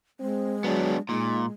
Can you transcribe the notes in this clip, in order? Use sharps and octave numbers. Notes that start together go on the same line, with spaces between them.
G#3 C4
F#3 B3 D4
A#2 G#3 D#4